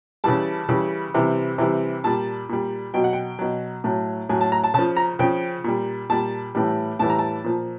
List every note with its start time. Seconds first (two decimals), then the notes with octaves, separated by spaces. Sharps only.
0.24 C#3 E3 G3 A5
0.69 C#3 E3 G3
1.14 C3 E3 G3
1.58 C3 E3 G3
2.04 A#2 G3 A5
2.49 A#2 G3
2.94 B2 F#3 G5
3.04 F#5
3.13 G5
3.39 B2 F#3
3.84 A2 F#3
4.29 A2 F#3 G#5
4.41 A5
4.52 A#5
4.64 A5
4.74 C#3 A5
4.79 F3
4.96 A#5
5.19 C#3 F3 G5
5.64 A#2 G3
6.10 A#2 G3 A5
6.55 A2 E3 G3
6.99 A2 E3 G3 A5
7.10 A#5
7.19 A5
7.44 A#2 F3